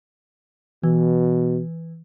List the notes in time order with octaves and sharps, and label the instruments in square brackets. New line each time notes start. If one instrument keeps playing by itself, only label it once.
[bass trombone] B2 [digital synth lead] E3